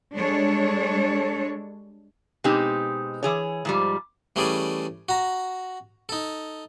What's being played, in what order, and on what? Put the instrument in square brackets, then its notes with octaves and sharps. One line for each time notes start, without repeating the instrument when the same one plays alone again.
[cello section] G3 G#3 D4 A4 C#5
[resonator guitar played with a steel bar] B2 G#3 C4 D#4 G4
E3 G#4 C#5
G#2 F3 G3
[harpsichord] E3 G3 A3 C#4 G#4 D5
F#4 A#5
D#4 A4